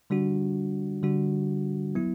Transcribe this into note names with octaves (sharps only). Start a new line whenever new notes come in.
D3 G3 D4 F#4
D3 G3 D4 F#4
F#3 B3 E4